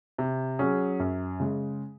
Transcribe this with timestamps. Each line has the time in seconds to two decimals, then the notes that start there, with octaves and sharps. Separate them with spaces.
0.18 C3
0.59 F#3 C#4 G#4
1.00 F#2
1.40 C#3 G#3